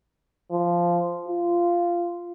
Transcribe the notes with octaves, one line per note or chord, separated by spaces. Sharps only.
F3
F4